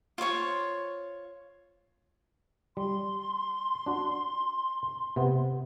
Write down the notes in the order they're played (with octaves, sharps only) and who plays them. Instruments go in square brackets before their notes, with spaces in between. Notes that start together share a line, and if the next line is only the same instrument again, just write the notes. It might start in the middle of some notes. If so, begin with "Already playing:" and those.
[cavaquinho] F4 C5 C#5 C#6
[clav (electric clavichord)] G3 [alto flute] C6
[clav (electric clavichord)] D4 F#4
C3 B3